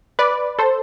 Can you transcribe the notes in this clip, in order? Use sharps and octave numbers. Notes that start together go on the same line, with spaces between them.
B4 D5
A4 C5